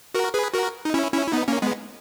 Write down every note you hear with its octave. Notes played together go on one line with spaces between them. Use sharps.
F#4 A#4
G#4 B4
F#4 A#4
D#4
C#4 E4
C#4 E4
E4
B3 D#4
A#3 C#4
G#3 B3